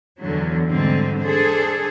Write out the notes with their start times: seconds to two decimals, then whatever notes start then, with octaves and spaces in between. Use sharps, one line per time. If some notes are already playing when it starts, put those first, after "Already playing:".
0.21 E2 D3 E3 F#3
0.67 G#2 D3 G3 G#3 C4
1.22 D4 G#4 A4 C5